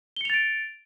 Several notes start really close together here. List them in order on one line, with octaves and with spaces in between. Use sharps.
G7 C#7 F7 A6 D7